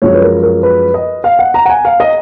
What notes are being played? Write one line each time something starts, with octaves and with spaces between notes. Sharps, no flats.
F#2 F3 G#3 C#5
B4
A#4
A#4
B4
D#5
F5
F#5
A#5
F#5
G#5
F5
D#5